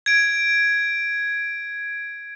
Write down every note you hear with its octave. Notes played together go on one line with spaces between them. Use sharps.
G#6 D7